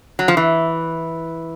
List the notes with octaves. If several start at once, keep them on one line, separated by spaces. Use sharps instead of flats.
F#3
F3
E3